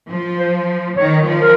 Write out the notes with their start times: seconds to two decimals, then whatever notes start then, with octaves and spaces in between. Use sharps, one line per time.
0.09 F3
0.39 C5
0.96 D#3 C#5
1.27 F3
1.41 A#4